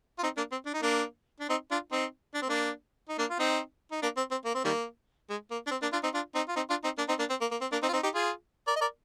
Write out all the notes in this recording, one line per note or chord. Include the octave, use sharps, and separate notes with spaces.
F4
C4 D#4
A#3 D4
C4
D4
D#4
A#3 D4
D4
C4 D#4
D4 F4
C4 D#4
D4
C4
A#3 D4
D#4
A#3 D4
F4
C4 D#4
D#4
A#3 D4
C4
C4
A#3
C4
D#3 G3 A#3
G#3
A#3
D4
C4
A#3 D4
D4 F4
C4 D#4
D4 F4
C4 D#4
F4
C4 D#4
D4 F4
C4 D#4
A#3 D4
C4 D#4
A#3 D4
C4
A#3
A#3
C4
A#3 D4
C4 D#4
F4
C4 D#4
D#4 G4
F4 G#4
A#4 D5
D#5
A#4 D5